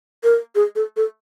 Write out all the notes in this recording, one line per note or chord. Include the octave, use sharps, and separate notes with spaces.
A#4
G#4
A4
A4